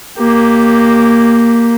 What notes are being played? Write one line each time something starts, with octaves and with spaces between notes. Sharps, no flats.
A#3 G4